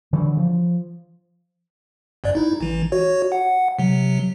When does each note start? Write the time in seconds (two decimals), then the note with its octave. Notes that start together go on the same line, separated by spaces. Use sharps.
0.13 D3 E3 F#3 G3
0.37 F3
2.24 G1 G2 D5
2.35 D#4 E4
2.60 A1 E3
2.92 F#4 C#5
3.32 F#5
3.79 C3 F#3